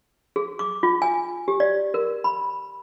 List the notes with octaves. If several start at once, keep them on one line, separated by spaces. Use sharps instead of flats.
G#4
D6
F4
G#5
G4
D5
A#4
B5